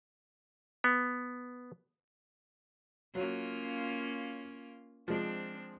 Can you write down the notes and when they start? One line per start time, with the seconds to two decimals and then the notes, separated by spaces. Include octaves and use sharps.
0.84 B3
3.15 F#3 A#3 C#4 F4
5.08 F3 G#3 C4 D4